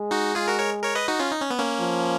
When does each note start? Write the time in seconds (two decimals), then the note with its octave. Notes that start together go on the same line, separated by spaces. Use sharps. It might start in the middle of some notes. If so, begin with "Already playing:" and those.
Already playing: G#3
0.11 D#4 F#4
0.35 F4 G#4
0.47 F#4 A#4
0.59 A#4 C#5
0.83 A#4 C#5
0.95 B4 D#5
1.08 D#4 F#4
1.19 C#4 F4
1.32 D#4
1.41 C#4
1.51 B3
1.59 A#3 C#4
1.80 F3